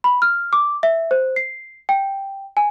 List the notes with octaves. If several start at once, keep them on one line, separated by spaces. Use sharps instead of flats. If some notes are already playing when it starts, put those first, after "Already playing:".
B5
F6
D6
E5
C5
C7
G5
G#5